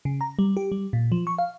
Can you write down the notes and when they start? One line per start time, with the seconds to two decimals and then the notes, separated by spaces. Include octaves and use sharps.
0.05 C#3
0.21 A#5
0.39 G3
0.57 G4
0.72 G3
0.93 A#2
1.12 F3
1.27 C#6
1.38 F5